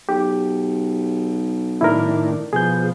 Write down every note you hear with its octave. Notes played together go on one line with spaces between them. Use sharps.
B1 G4
A2 D#3 D4 E4 A#4
B2 F3 G#4 G6